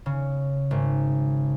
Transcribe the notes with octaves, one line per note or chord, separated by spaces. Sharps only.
C#3
G#1